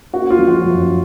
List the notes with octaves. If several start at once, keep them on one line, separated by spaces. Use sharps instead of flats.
A#3 F#4
F4
F3
F#4
F#2